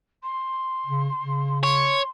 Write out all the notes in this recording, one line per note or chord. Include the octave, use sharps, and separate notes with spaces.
C6
C#3
C#3
C#5 C6